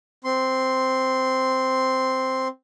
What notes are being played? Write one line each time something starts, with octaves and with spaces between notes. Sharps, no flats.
C4 C6